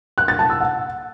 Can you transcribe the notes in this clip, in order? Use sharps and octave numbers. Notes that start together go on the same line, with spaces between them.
F#6
A6
A5
E6
F#5